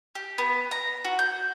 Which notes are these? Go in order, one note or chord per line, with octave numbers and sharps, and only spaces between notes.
G4
B3
A#5
F#4
G6